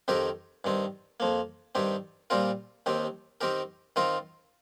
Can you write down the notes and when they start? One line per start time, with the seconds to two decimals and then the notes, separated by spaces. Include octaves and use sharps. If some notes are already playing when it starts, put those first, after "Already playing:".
0.08 F2 D#3 C4 G4 A#4
0.64 G2 D#3 C4
1.20 F2 F3 A#3
1.75 G2 D#3 C4 G4
2.30 A#2 G3 C4 F4 A#4
2.86 D#2 D#3 C4 G4
3.41 D#3 C4 G4 A#4
3.96 D#3 C4 F4 A#4